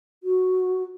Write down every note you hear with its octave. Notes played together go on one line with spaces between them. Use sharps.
F#4